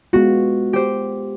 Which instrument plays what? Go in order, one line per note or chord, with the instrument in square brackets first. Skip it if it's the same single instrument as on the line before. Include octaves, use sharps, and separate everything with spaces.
[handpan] G#3 B3 F4 [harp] F#4
[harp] G4 C5